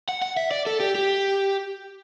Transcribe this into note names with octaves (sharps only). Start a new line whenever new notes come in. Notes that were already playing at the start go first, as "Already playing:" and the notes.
F#5
F#5
E5
D5
A4
G4
G4